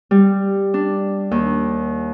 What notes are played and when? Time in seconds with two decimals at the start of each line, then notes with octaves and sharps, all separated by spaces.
0.11 G3
0.74 D4
1.31 D#2